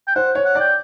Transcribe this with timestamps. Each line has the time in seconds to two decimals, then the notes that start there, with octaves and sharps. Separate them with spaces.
0.07 G5
0.16 C5 F#5
0.35 C#5
0.45 F#5
0.55 D5
0.60 G5